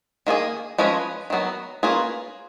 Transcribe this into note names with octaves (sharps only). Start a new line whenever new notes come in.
D#3 A#3 F4 G#4
F3 G#3 C#4 G#4 B4
D#3 F#3 B3
A#3 C#4 F4 G#4 B4